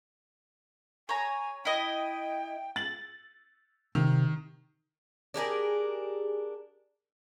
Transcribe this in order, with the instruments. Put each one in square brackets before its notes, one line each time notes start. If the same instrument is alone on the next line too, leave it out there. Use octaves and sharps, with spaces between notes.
[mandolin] C#5 A#5 [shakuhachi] G#5
[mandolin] E4 D#5 [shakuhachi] G5
[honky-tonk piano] A6 F#7
[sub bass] C3 [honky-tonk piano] D#3
[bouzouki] D4 G4 G#4 A#4